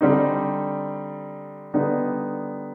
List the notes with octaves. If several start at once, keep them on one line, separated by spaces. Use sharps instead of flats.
D3 G3 C4 D#4
D3 G3 B3 D#4